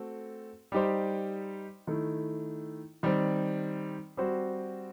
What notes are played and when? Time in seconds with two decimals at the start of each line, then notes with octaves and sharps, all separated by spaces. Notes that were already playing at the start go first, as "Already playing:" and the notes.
Already playing: A3 C4 F#4 A4
0.72 G3 D#4 G4 C5
1.87 D#3 A3 E4
3.03 D#3 G3 C4
4.17 G3 C4 F#4 C5